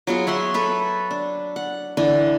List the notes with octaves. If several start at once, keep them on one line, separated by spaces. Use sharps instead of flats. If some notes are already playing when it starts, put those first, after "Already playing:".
F#3 B3 F4 G#4
C#5 E5 F#5 C6
A4 B4 E5
D4
F#5
D3 E3 D4